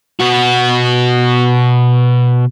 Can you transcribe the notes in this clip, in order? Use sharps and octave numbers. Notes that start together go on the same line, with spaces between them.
B2 F#4